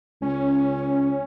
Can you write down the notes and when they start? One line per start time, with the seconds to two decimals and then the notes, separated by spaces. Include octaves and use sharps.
0.22 C#2 C#4